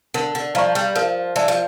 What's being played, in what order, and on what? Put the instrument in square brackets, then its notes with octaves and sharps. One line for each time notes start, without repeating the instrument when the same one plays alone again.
[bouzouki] D3 [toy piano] A#4
[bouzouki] D3
[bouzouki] F3 [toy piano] D5 F5 A#5 C#6
[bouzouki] G3
[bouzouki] F3 [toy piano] A#4
[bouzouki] E3 [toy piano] D5 A5
[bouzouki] F3